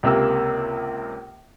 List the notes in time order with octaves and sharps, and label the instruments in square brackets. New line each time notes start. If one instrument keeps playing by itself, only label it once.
[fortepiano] C#2 C3 A#3 E6